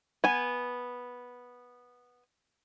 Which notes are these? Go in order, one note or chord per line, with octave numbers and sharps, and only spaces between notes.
B3 G#5